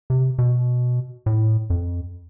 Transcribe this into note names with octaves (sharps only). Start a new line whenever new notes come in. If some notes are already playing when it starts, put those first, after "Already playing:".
C3
B2
A2
F2